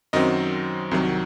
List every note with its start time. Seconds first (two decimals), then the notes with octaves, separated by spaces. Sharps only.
0.13 F#2 D#3 F#3 C4 D#5
0.91 C2 C3 D#3 F#3